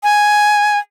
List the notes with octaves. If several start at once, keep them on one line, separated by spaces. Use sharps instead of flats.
G#5